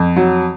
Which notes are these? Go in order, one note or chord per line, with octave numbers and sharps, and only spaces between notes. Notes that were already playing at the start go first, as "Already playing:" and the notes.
Already playing: F2
F#3